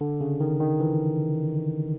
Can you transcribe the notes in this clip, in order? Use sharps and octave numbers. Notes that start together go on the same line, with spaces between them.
D3
C#3
D#3
D#3
E3